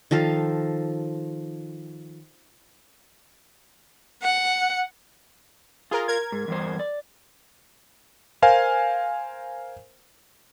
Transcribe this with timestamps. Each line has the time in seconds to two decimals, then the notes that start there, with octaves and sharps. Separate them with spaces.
0.11 D#3 F3 A4 F5
4.23 F#5
5.91 F4 G#4 A#4
6.08 A#4 G#6
6.32 G#2
6.48 E2 G2 C5
6.79 D5
8.42 A#4 C5 F5 G#5